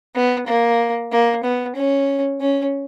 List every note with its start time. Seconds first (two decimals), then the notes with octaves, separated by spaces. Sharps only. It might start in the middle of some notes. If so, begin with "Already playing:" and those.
0.15 B3
0.47 A#3
1.11 A#3
1.43 B3
1.76 C#4
2.41 C#4